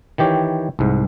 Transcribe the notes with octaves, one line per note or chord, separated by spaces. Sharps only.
D#3 E3 G4 C#5
C2 G#2